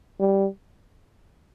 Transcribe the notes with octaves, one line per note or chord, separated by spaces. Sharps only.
G3